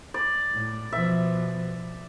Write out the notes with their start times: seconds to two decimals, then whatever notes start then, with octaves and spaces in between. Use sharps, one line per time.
0.14 D5
0.52 A2
0.92 B2 F3 E5